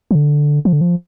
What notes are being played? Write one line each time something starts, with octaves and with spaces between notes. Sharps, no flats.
F3
D3
F3
D3
F3